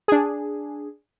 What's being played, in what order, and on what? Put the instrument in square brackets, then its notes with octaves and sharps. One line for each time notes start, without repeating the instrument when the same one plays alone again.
[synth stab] D4 G#4